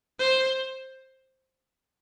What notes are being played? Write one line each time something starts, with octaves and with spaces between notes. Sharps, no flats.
C5